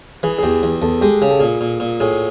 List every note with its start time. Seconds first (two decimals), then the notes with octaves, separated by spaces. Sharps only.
0.23 E3 G#4
0.38 G#4
0.43 E2 G4
0.63 E2
0.82 E2 A4
1.01 G#3 G4
1.22 C#3 G#4
1.31 A4
1.39 A#2 G#4
1.61 A#2
1.80 A#2
2.00 A2 G#4